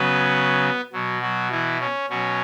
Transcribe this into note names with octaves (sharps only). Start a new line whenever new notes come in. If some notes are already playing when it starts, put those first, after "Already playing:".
Already playing: C#3 F#3 B3 B4
B2 F#3
F#3 F#4
E3 E4
C#4
B2 F#3 C#4